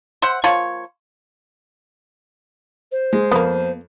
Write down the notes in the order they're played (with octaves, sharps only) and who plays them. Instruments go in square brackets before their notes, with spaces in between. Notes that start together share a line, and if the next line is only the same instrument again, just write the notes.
[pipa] C5 E5 F#5
F3 A#3 F4 C#5
[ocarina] C5
[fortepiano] G#3
[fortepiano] F2 [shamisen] A#3 B3